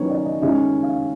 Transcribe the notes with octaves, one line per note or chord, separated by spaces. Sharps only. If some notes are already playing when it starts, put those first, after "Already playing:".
Already playing: D#3 F#3 A#3 C#4 B4 C#5
D5
D#5
D#3 G#3 C#4 E5
F5